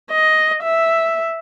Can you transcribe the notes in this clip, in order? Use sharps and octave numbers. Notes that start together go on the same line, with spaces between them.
D#5
E5